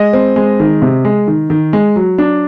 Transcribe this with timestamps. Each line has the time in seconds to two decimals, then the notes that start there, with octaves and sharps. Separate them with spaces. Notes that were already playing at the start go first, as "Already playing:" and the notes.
Already playing: G#3 D#5
0.13 C4
0.36 G#3
0.60 D#3
0.82 C3
1.05 G#3
1.27 D#3
1.50 D#3
1.73 G#3
1.96 F#3
2.18 D4